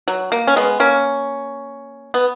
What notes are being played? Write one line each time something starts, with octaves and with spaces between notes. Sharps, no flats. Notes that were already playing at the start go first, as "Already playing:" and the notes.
F#3
A#3
C#4
G#3 B3
A#3 C#4
B3